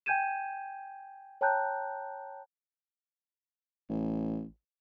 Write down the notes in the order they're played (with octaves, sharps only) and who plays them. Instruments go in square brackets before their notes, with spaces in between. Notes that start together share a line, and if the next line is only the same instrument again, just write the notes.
[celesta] G5 G#5 G6 G#6 D#7 E7
C#5 G5 A5 A#5 F#6 G6
[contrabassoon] A1